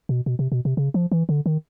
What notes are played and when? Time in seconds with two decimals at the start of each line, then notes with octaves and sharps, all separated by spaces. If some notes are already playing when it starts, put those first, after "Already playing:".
0.09 B2
0.26 B2
0.39 C3
0.52 B2
0.65 C3
0.77 C#3
0.94 F3
1.12 E3
1.29 D3
1.46 D#3